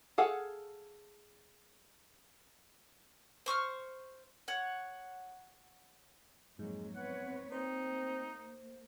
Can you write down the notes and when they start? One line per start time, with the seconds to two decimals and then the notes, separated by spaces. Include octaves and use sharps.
0.18 G#4 A4 F5 F#5
3.46 C5 C#6 E6 F6
4.48 C#5 F#5
6.59 F2 G#2 F#3 G#3 A#3
6.96 B3 C4 B4 C#5 F#5
7.52 A#3 C4 D#4 C5